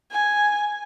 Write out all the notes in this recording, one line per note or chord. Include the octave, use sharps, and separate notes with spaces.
G#5